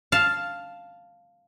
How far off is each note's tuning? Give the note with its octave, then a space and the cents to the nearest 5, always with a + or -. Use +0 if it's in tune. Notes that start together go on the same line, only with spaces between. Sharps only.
F5 +0 A5 +0